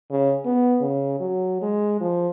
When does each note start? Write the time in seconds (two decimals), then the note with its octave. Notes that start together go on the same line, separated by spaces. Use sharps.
0.11 C#3
0.46 B3
0.81 C#3
1.20 F#3
1.62 G#3
2.01 F3